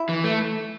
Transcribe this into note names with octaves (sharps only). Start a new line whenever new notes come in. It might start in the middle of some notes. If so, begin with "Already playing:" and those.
Already playing: E4
E3
A3